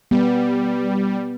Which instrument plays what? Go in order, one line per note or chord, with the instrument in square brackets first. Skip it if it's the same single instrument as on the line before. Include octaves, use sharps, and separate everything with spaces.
[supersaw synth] G3 [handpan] B3